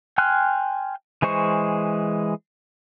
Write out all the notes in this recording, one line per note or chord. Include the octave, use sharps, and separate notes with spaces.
G5 G#5 C6 F6 F#6
E3 G#3 C5 C#6